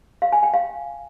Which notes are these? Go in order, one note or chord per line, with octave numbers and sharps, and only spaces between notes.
F5
G#5
G5
F5